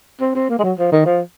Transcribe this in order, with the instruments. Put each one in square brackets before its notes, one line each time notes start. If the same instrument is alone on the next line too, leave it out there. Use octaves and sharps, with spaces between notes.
[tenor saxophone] C4
C4
A#3
G#3
F#3
F3
D#3
F3